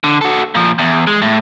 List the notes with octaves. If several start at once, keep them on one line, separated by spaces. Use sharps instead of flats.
D3
F#4 A4
A#2 F3
E2
G#3
A2